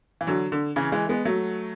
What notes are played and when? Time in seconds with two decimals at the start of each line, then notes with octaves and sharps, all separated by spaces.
0.21 E3
0.27 D3 F#3
0.52 D3
0.76 C#3 E3
0.92 E3 G#3
1.09 G#3 B3
1.25 F#3 A3